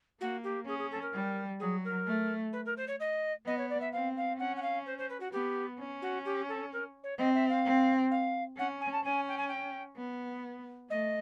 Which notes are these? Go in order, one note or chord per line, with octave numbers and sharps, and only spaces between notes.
A#3 F#4
G4
C#4 G#4
G#4
A4
A#4
G3
F#3 G#4
A#4
A3
B4
A#4
C5
C#5
D#5
B3 D#5
C#5
D5
E5
C4 F5
F5
C#4 F#5
F#5
F5
C5
C5
B4
F#4
B3 G4
C#4
F#4
G4
A4
A#4
C#5
C4 D#5
E5
F5
C4
F5
C#4 F#5
G#5
A5
C#4 G#5
G5
G#5
G5
B3
A3 D#5